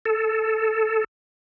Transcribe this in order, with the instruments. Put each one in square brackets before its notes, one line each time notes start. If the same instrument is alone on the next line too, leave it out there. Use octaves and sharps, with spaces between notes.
[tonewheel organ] A4